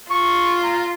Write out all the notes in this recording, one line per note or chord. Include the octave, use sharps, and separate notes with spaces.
F4 C#6
A#5